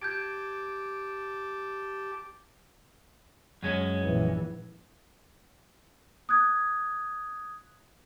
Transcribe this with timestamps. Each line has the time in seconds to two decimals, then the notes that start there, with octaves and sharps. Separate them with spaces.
0.02 G4 A5 D6 G6 G#6 D7
3.62 F#2 G#3 C#4
4.02 A#1 E3
6.29 D#6 F#6 G#6